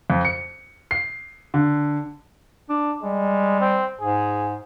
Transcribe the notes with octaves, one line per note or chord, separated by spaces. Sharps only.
F2
C#7
C7
D3
D4
G3 G#3
C4
G#2 G#4